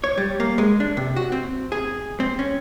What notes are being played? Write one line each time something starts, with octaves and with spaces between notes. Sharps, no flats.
C#5
G3
A#3
G#3
D4
C3
F#4
C4
G#4
C4
C#4